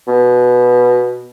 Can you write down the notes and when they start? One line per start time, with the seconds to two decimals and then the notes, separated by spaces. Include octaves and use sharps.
0.08 B2